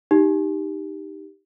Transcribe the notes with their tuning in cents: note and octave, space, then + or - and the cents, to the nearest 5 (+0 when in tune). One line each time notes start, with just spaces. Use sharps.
D#4 +0 G4 +0